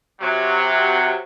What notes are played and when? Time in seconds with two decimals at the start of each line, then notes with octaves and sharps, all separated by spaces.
0.20 C3 F#3